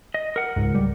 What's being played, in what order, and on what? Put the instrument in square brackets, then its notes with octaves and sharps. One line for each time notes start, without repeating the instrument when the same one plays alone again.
[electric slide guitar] D#5
A#4 F#5
[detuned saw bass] C#2 [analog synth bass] G#2
[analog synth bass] G3